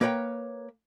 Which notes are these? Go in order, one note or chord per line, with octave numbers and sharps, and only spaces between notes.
A#3 A#4 B4 C#5 G5